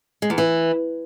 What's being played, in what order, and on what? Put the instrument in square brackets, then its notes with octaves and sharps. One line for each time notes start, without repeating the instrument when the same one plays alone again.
[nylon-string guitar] G#3
E2
E3